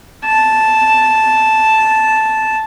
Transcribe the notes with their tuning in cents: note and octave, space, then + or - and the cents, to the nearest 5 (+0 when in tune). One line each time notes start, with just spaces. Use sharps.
A5 -5